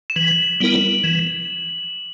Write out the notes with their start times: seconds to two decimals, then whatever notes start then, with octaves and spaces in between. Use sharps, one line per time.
0.10 E7
0.16 E3 F#7
0.60 G3 B3 E4 A#4
1.04 E3